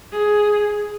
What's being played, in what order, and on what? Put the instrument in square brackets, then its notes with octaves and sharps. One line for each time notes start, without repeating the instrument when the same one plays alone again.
[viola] G#4